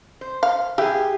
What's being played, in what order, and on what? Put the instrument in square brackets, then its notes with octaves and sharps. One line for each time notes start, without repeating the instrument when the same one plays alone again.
[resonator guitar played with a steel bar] C5
[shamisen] F5
[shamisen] E3 E4 F5 [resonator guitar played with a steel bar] G4 G#4